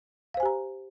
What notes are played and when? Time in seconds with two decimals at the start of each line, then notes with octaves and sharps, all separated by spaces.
0.34 F5
0.37 C5
0.40 G#5
0.43 G4
0.46 A#5